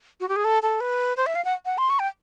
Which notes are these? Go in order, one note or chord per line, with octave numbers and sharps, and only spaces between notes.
F#4
G4
G#4
A4
A4
B4
C5
E5
F5
F#5
F#5
C6
C#6
G5